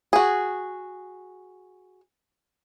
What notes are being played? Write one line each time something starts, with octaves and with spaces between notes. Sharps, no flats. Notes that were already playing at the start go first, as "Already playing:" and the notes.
F#4 G#4